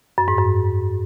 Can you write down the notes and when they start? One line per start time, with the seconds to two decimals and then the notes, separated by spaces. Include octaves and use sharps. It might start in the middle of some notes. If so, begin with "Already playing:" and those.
0.18 F#2
0.28 G#2
0.38 F#2